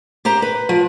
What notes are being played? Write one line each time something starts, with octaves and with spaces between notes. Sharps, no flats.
G4 C5 A#5
B4
F3